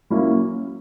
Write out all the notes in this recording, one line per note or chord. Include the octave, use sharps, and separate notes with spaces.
F#3 A#3 C#4 E4